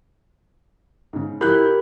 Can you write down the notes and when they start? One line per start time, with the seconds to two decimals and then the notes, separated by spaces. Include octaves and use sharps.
1.13 G#2 C#3
1.41 F3 E4 G4 A#4 B5 F#6 G6